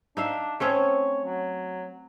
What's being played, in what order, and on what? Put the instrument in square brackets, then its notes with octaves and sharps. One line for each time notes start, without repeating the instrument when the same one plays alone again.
[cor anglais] D4 [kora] D#4 E5 F5
[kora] A3 C4 C#4 [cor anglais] C#5
[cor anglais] F#3